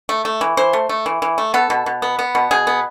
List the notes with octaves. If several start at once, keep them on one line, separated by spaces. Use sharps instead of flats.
A3
A3
E3
E3 C5
A3
A3
E3
E3
A3
B3 A4
B2
B2
B3
B3
B2
B2 G#4
B3